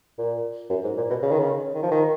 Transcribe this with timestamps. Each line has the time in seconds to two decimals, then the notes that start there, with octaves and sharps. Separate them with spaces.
0.18 A#2
0.70 F#2
0.84 G#2
0.97 A#2
1.10 B2
1.23 C#3
1.32 D#3
1.39 C#3
1.75 D#3
1.83 F3
1.91 D#3